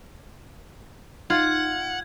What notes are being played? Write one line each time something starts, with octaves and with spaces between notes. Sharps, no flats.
D#4 F4 F#5 G#6